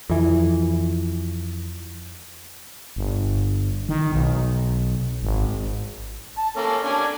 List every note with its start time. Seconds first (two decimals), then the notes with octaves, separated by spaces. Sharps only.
0.09 F2 E3
2.96 G1
3.89 D#3
4.12 B1
5.23 G#1
6.38 A5
6.56 A#3 C#4 A4
6.84 C#4 D4 G#5